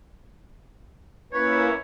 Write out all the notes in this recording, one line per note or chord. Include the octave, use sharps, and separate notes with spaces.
A#3 C#4 E4 B4 C#5